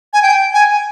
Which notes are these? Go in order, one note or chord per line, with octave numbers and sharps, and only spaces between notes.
G#5
G5
G#5